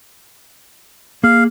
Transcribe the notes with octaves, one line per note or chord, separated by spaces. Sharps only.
A#3 G#4 F5